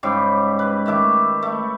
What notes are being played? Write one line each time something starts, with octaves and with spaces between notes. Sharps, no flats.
G#2 C#3 G3 G4
B4
D#3 A3 E5 D6
A3